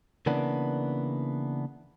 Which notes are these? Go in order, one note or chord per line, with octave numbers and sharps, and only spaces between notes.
C#3 E3 A#3 B3 D4